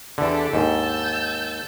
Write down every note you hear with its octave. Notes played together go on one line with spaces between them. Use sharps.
E2 D3 D4 G4 A4
D#2 G#2 A5 E6 G6